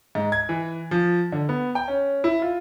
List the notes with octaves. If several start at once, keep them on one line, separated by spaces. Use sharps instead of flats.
G#2
G#6
E3
F3
D3
B3
G5
C#4
E4
F4